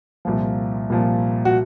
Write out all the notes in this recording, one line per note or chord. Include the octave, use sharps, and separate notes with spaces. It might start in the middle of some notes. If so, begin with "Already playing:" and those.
C2 A#2 F3
C2 A#2 F3
F#4